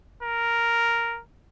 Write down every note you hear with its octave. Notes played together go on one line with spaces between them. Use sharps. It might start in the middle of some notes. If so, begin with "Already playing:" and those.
A#4